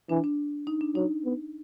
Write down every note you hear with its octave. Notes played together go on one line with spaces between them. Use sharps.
E3 D4
D4
D#4
D4
F#3 D#4
B3